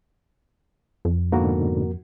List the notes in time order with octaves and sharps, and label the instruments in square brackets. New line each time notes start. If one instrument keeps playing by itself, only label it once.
[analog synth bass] F2
[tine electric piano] G#2 B2 D3 [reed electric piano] A#3 F#4 A#4